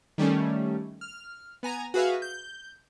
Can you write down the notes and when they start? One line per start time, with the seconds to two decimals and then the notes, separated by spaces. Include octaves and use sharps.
0.18 D#3 G3 A3 C#4
1.01 F6
1.63 B3 G#5 A#5
1.94 F#4 G#4 B4 E5 F5
2.22 G6